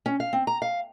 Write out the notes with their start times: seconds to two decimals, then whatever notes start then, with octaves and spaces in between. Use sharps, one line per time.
0.06 C#4
0.20 F5
0.33 C4
0.47 A#5
0.62 F5